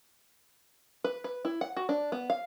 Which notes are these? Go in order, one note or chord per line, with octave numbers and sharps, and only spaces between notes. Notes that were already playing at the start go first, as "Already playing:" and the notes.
B4
B4
E4
F#5
F#4
D4
B3
F5